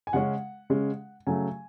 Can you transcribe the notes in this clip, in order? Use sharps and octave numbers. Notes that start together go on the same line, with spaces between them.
G#5
C#3 G#3 C#4 F#5
C#3 G#3 C#4
C#3 F#3 A3 G#5